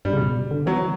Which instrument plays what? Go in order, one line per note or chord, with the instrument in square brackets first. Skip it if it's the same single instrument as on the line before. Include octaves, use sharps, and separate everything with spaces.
[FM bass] G2 [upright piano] G3
[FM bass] C#3
B2
D3
[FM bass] E3 [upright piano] F#3